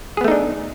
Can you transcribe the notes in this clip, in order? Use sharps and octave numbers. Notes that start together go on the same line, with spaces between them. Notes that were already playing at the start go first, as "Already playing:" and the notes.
A3 B3 D4 D#4 G#4